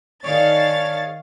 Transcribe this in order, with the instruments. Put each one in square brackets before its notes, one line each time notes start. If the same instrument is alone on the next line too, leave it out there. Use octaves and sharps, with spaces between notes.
[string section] D#3 F5 A6 [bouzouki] D4 D#4 G#4 [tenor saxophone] C#5